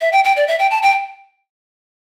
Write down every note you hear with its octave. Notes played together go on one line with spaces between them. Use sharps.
E5
G5
G5
D5
E5
G5
A5
G5